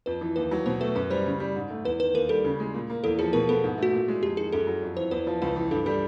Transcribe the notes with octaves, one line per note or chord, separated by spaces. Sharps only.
F2 B4
E3
D#2 B4
F#3
B2 C5
A3 B4
F#2 B4
G3 C5
C#3
G3
G#2
A3
E2 B4
D#3 B4
D#2 A#4
G3 A4
C#3
G#3
A#2
A#3
E2 A4
F3 G#4
B2 A#4
B3 A4
G#2
A3 F#4
A#2
G#3
F2 G4
D#3 G#4
F#2 A4
F#3
F2
E3 C5
E2 B4
F3
C#2 B4
E3
G2 A4
G3 A4